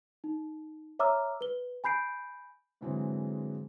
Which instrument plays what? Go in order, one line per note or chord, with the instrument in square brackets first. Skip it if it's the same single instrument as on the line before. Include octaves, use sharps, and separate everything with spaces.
[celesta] D#4
C#5 E5 A#5 D6 E6 F6
B4 G7
G#5 B5 G6 C7 D7
[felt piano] G#2 D3 E3 F#3 G#3 C4